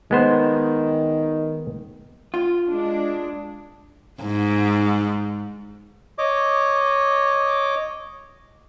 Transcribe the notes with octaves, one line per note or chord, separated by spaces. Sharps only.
D#3 G#3 B3 C5
F4
G#3 D4
G#2
C#5 D#5 D6